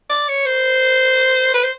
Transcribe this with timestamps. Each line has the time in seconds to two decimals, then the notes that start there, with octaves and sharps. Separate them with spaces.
0.10 D5
0.28 C#5
0.46 C5
1.54 B4
1.63 C5